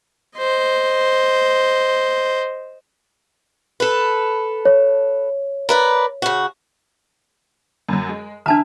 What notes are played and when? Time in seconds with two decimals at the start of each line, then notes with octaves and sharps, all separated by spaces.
0.38 C5 D#5
3.80 A4 B4
4.65 C#5
5.69 A#4 B4 D5
6.22 C#3 F#4
7.89 F#2 F#3
8.09 G#3
8.46 E2 D4 E5 A5 A#5 F6